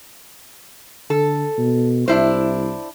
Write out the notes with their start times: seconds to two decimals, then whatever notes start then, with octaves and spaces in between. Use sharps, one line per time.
1.10 D3 A4
1.58 B2
2.08 C2 D4 E4 C5